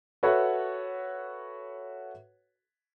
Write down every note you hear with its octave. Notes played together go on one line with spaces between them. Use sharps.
F#4 A4 B4 C#5 E5 F#5